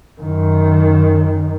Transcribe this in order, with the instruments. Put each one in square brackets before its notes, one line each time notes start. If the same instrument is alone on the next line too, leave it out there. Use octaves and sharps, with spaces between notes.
[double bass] F#2 D#3